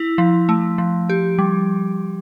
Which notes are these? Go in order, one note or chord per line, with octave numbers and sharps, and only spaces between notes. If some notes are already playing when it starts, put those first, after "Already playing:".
Already playing: E4
F3
A3
F3
G4
G3